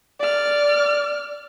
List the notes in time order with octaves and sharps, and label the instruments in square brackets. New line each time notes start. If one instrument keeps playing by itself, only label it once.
[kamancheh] D5 F6